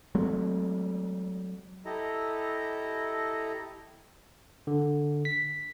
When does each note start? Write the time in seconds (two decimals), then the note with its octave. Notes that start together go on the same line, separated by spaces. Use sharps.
0.15 F#3 G#3 A3 C4
1.85 E4 G4 A4 D#5 A#5
4.67 D3
5.25 B6